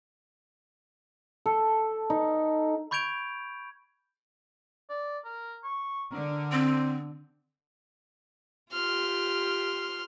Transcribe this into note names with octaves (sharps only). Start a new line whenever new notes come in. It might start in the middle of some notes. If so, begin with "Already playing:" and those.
A4
D#4
B5 C#6 G6 G#6 D7 F7
D5
A#4
C#6
D3 A#4
C4 C5
F4 G4 C6 F6